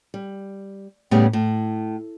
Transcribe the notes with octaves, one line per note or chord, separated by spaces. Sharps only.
G3
A2 C#3 G3 B3 G4 G#4
A2